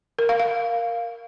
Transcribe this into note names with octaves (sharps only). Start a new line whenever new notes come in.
A#4
F5
F5